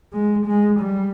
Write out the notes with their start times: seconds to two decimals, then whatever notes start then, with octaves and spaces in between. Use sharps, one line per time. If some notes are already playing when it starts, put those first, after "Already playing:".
0.13 G#3
0.46 G#3
0.80 G3